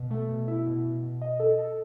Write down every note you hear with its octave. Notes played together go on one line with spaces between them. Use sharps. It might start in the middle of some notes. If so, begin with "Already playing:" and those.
Already playing: B2
A3
B2
E4
B2
B2
B2
D#5
A4
A4